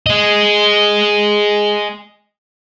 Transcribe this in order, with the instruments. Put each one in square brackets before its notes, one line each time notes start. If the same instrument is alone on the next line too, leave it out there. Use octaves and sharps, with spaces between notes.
[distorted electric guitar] G#4 D#5